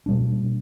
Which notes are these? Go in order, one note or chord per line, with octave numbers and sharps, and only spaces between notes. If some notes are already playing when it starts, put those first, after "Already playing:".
B2 G3 A#3 D4